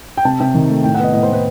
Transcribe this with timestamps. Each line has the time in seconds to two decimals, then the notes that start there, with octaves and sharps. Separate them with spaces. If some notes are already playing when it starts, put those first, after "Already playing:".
0.17 G5
0.25 C3 A5
0.40 C3 G5
0.55 D#3
0.70 A3
0.84 A2 G5
0.95 F#5
0.99 B3 D#5
1.14 A2 D#5
1.23 C5
1.28 A2 B4